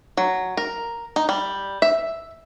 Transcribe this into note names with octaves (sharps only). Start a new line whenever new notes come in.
F#3
A#4
D#4
G3
E5